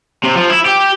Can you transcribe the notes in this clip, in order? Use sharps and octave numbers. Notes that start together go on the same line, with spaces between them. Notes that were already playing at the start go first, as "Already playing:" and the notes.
C3
F3
E4
G4